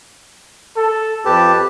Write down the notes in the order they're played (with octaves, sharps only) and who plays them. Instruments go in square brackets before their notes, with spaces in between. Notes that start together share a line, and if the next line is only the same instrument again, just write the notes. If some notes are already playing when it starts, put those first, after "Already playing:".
[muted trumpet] A4
[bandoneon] F2 G4 A5 [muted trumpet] B4